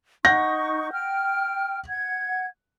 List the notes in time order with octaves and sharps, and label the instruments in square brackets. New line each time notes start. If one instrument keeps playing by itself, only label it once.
[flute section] D#4 C#6 [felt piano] F#5 G6 A#6
[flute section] G5 F6
F#5 G#6